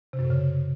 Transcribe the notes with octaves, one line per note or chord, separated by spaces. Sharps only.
C3
F#2
A2
C#3